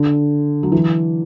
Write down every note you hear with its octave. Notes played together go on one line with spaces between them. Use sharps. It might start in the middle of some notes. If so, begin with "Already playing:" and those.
Already playing: D3
F#3
E3